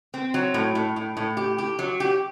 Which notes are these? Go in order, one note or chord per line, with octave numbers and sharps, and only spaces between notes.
C4
F#3
A2
A2
A2
A2
G4
G4
F#3
G4